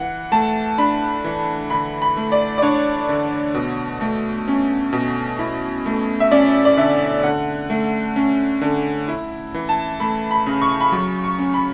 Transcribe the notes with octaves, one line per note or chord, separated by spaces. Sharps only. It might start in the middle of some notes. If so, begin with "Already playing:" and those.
Already playing: E3 F#5
A3 A5
D4 B5
E3
D3 B5
B5
A3
D5
D5
D4 C#5
D3
B2
A3
C#4
B2
E4
A3
E5
C#4 D5
D5
D3 E5
D3 F#5
A3
C#4
D3
E4
E3
A5
A3 B5
B5
C#3
C#6
B5
F#3 C#6
C#6
C#4
B5